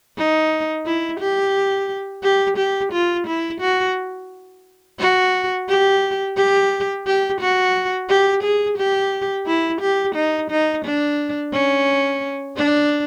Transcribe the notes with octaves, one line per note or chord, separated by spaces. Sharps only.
D#4
E4
G4
G4
G4
F4
E4
F#4
F#4
G4
G4
G4
F#4
G4
G#4
G4
E4
G4
D#4
D#4
D4
C#4
D4